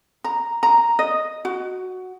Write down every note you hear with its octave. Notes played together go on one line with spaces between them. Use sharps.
A#5
A#5
D#5
F#4